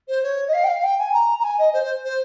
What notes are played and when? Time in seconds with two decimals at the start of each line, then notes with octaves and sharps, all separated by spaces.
0.08 C5
0.23 C#5
0.48 D#5
0.53 F5
0.64 G5
0.68 F5
0.79 F5
0.84 G5
0.98 G#5
1.13 A#5
1.39 A#5
1.44 G#5
1.58 D#5
1.73 C5
1.83 C5
2.04 C5